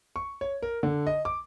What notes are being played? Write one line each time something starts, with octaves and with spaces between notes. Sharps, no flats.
C#6
C#5
A#4
D3
D#5
D6